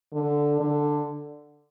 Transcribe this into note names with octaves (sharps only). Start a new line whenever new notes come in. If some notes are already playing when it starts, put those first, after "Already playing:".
D3
D3